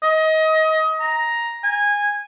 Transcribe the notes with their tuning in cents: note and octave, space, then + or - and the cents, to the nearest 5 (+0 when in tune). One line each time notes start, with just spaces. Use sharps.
D#5 +25
A#5 +5
G#5 -15